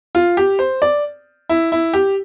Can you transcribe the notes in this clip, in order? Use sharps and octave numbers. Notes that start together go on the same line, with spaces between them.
F4
G4
C5
D5
E4
E4
G4